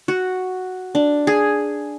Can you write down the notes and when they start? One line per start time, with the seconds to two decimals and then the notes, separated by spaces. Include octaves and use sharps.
0.08 F#4
0.95 D4
1.27 G#4